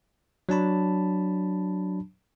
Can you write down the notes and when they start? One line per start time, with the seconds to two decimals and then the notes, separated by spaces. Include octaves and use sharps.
0.49 F#3 D4 A5 B5